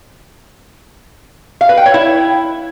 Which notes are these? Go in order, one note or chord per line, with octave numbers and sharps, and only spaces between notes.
F5
B4
G5
C#5
E4